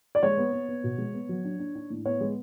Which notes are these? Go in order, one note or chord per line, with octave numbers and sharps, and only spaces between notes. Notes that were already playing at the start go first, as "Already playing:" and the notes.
D5
G#3 C#5
B3
B3
B3
B2
G#3
B3
F#3
D4
D4
D4
A2
B3 C#5
G#3